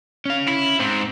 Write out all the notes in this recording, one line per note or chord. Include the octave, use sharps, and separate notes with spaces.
C#4 F5
E4
G#2 C4